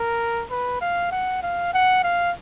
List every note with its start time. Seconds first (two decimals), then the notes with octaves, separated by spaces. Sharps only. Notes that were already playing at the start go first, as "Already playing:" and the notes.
Already playing: A#4
0.50 B4
0.81 F5
1.11 F#5
1.43 F5
1.73 F#5
2.04 F5